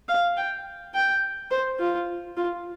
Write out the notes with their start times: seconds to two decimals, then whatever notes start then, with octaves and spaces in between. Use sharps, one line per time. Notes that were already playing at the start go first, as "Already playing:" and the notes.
0.09 F5
0.37 G5
0.94 G5
1.51 C5
1.80 F4
2.37 F4